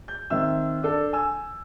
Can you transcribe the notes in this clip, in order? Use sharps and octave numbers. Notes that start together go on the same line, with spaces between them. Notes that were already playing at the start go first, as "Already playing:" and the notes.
G6
D#3 C4 E5 E6
D4 A4
G#5 E6